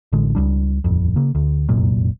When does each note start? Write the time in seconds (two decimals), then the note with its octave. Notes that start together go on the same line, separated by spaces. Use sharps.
0.13 A1 D3 G#3
0.35 C#2 G3 D4
0.84 D#1 A1 F2
1.16 C#3 A#3
1.35 D2
1.69 F1 C2 F#2 A#2